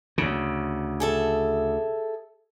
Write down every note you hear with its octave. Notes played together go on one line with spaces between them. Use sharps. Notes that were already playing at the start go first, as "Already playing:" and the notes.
D2 C#3
G#4 A4 E5